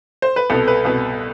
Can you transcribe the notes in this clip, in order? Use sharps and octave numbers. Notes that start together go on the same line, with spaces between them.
C5
B4
C2 B2 B3 A4
B4
C2 B2 B3